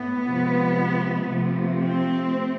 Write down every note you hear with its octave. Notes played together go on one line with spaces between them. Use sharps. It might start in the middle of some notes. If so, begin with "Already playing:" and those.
Already playing: A2 B3
C3 F3 G#3
C3 F3 A3
C4
A3